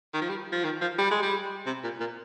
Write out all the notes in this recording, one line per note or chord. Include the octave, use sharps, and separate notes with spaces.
D#3
F3
G3
F3
D#3
F3
G3
G#3
G3
C3
A#2
A#2